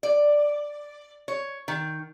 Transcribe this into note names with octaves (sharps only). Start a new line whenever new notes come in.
D5
C#5
D#3